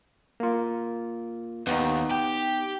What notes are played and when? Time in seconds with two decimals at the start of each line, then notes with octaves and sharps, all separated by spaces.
0.40 A#3 F4
1.67 D#2 B3 D#4
2.11 G4